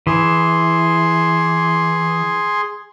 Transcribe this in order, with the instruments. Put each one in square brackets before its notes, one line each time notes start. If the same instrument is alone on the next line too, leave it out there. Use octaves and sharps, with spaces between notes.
[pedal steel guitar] E3 [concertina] G#4 C6